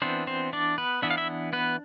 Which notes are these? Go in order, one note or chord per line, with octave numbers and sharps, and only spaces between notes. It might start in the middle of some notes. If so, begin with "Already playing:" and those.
E3 B3 C4 D4 C5
C4 C5
D4 D5
B3 B4
E3 B3 D4 E5
F5
E4 E5
B3 B4